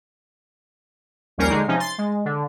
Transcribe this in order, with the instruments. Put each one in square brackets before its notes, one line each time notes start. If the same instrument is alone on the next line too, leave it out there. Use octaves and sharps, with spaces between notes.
[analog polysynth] A#1 D#2 G3 C#4 A#4 C7
D3 G#3 D#4
C3 F3 C#4 D#4
C6 A6
G#3
D3